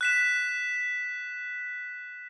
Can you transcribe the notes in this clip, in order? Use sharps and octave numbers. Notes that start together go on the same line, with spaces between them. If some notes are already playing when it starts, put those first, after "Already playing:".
F#6 B6 E7